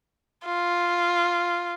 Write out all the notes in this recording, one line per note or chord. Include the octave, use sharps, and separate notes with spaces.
F4